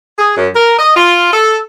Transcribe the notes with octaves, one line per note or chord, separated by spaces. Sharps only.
G#4
F#2
A#4
D#5
F4
A4